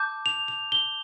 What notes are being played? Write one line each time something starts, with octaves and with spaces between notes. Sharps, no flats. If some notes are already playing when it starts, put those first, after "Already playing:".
Already playing: A5 D6 G6
F7
F7
G7